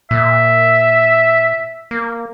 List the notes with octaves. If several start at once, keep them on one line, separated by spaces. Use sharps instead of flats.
A#2 E5
A#3